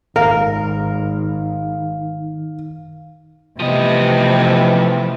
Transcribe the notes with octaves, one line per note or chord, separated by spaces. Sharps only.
G#1 D#3 A#4 F5
C3 E3 F3 A3 B3 D#5